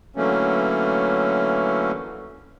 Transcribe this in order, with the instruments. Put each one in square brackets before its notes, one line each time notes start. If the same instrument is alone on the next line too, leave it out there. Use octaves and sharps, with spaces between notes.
[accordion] D3 E3 F#3 A3 A#3 C#4